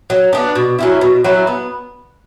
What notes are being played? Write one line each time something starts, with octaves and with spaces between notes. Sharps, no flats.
F#3
B3 D4
B2
F#3 C#4 E4
B2
F#3 C#4 E4
B3